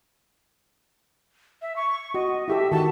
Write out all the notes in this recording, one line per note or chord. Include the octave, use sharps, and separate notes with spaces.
E5
C#6
F#4 D#5
E4 G4 A4 E5
D#3 F#4 A5